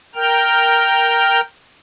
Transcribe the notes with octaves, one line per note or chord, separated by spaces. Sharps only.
A#4 G5 F6